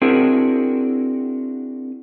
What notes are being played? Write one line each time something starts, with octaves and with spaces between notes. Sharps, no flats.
C4 D4 E4 F#4 G#4 A#4